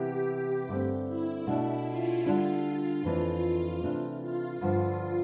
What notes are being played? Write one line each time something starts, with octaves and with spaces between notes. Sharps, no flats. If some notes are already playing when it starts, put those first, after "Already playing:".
Already playing: C3 E3 B3 E4 G4
G2 D3 A3 C4
E4
B2 A3 D4
F4
D3 G3 D4
F4
F2 E3 A3 D4 F4
C3 E3 A3 D4
F4
G2 D3 F3